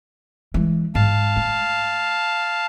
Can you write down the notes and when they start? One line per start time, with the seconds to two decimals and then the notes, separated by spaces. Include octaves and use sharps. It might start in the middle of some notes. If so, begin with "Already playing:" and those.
0.54 E3 G#3
0.95 G#2 F5 A5
1.36 A3